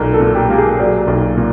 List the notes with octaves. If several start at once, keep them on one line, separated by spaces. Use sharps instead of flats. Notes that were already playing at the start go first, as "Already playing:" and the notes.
Already playing: B1 A#2 F#3 A#4
A4
A#2
G4
A#3
G#4
F#3 D5
B1
A#2